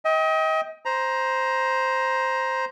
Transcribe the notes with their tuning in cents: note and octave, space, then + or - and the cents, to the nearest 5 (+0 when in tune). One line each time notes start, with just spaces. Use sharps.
D#5 +35 G5 +5
C5 +0 A#5 +15